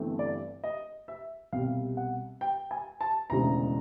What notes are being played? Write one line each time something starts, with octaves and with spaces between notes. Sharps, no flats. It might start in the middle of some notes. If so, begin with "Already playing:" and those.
Already playing: G1 G2 E3 A3 C4
D5
D#5
E5
C2 B2 G3 C4 F5
F#5
G5
G#5
A5
E1 D2 C#3 E3 G#3 A#5